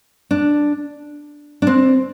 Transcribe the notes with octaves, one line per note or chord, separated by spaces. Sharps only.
D4
D4
C4